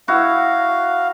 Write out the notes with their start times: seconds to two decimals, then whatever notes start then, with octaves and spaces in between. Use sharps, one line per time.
0.08 E4 F#4 F5